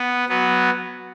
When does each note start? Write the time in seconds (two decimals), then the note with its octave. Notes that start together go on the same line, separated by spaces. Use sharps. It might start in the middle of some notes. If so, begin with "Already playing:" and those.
Already playing: B3
0.29 F#3 B3